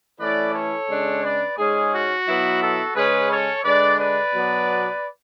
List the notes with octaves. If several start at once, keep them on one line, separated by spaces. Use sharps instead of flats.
E3 A3 C#4 E4 B4 D5
A4 C#5
C#3 G#3 D4
B4 D5
G#2 G#3 C#4 G#4
F#4
B2 F#3 B3 E4
F#4 A4
C#3 G#3 C#4 G#4 B4
A4 C#5
D3 G#3 D4 B4 D5
B4 D5
B2 F#3 B3 D4